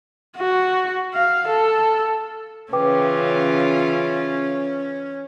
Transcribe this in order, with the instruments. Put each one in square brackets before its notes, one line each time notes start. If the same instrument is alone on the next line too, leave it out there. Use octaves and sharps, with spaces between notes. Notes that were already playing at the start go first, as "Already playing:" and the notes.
[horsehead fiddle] F#4
F5
A4
[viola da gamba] C#3 E3 F4 [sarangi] C#4 [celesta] B4 G5 D6